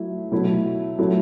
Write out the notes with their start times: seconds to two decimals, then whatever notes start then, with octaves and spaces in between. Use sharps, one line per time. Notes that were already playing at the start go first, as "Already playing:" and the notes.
Already playing: F#3 A3 E4
0.31 B2 F#3 A3 E4
0.99 F#3 A3 E4